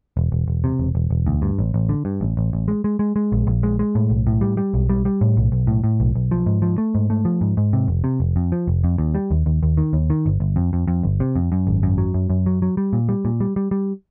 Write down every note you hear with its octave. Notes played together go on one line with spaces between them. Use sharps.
E1
E1
E1
C3
E1
E1
E1
D2
G2
A1
A1
D3
G2
A1
A1
A1
G#3
G#3
G#3
G#3
A#1
A#1
G#3
G#3
A2
B1
A2
G3
G3
B1
G3
G3
A2
B1
B1
A2
A2
B1
B1
F3
G#2
F3
A3
G#2
A3
F3
G#2
G#2
C3
F1
C3
F1
F2
F3
F1
F2
D#2
G3
D#2
D#2
D#2
D#3
D#2
D#3
G1
G1
F2
F2
F2
G1
C3
F2
F#2
G#1
F#2
F#3
F#2
F#2
F#3
F#3
G3
A#2
G3
A#2
G3
G3
G3